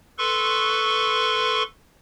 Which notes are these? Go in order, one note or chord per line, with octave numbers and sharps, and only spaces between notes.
A4 B4 C6 C#6